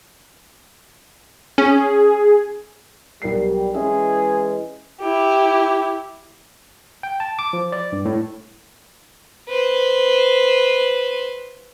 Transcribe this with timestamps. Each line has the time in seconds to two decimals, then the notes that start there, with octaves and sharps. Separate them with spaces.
1.58 C#4 G#4
3.22 B1 G3 A#4 C7
3.74 E3 G#3 C#4 E4 G#4 E5
5.00 E4 G4
7.03 G5
7.20 A5
7.39 D6
7.53 F3
7.72 D5
7.92 G2
8.05 A2
9.48 B4 C5